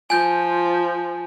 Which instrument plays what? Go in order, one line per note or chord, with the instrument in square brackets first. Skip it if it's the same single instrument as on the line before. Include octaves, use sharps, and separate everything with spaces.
[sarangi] F3 [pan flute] F4 [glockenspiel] G#5 G6